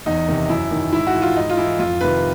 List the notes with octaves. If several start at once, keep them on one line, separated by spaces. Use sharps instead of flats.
E2 D#4
C3 D#3
F#2 E4
D#3
G#2 E4
F#4
E3
F4
G#2 D#4
F4
E3 E4
F2 F4
C3 D#3 B4